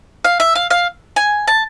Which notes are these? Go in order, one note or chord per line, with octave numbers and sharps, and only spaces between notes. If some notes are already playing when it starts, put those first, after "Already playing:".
F5
E5
F5
F5
G#5
A5